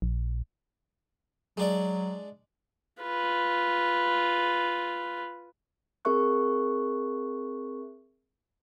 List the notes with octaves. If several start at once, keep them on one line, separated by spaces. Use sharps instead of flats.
A#1
F#3 G#3 D4 D5
F4 B4
C4 G#4 A#4 E5 C#6 F#6